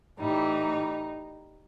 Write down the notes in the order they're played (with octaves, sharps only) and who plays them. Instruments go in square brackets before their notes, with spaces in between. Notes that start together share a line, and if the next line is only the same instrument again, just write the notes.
[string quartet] A2 E3 G3 D#4